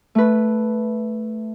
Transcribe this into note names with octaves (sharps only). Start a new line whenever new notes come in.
A3 B4